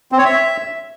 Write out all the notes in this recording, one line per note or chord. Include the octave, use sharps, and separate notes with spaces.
C4
C#5
E5